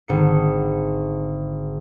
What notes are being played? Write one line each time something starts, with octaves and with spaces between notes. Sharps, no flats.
G#1 D3 C#7